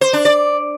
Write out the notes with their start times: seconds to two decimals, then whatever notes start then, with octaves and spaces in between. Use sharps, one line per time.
0.01 C5
0.13 D4
0.25 D5